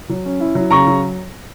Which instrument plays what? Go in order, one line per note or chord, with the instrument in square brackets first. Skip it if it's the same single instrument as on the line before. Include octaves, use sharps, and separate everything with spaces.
[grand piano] F#3
C#4
E4
F#3
C#3 A#5 C#6
F#3